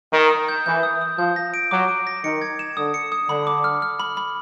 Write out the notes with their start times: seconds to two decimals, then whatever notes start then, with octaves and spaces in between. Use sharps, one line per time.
0.13 D#3 D#7
0.31 D#6
0.48 G6
0.66 E3 G6
0.83 D#6
1.01 D#6
1.18 F3 G6
1.36 A#6
1.54 D7
1.71 F#3 D6
1.88 D7
2.07 A#6
2.24 D#3 C#7
2.42 G#6
2.59 E7
2.77 D3 D#6
2.94 C#7
3.12 D#6
3.29 D3 B5
3.47 D6
3.64 F6
3.82 F6
4.00 B5
4.17 B5